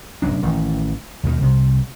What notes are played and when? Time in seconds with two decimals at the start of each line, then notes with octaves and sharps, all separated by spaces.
0.22 F1 E2 F#3 D4
0.43 A1 D#3 E3
1.23 D#2 B2 D#3
1.41 C2 C3